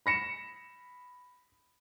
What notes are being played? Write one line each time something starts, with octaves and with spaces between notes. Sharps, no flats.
B5 A#6 C#7 E7